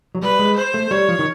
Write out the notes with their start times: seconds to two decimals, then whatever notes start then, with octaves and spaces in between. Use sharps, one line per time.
0.15 F#3
0.22 G3 B4
0.39 G#3
0.57 C5
0.74 A3
0.91 G3 C#5
1.09 F3
1.19 D#3